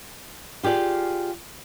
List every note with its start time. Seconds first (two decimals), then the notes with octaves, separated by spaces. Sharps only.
0.63 F4 G4 G#4 D5 F5